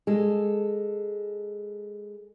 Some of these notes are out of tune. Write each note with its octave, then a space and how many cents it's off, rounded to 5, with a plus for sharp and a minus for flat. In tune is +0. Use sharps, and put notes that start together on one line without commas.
G#3 -5 A4 +0